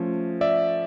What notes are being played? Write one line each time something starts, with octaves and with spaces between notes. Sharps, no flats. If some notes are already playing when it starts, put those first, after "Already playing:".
Already playing: F3 A3 C#4
D5 E5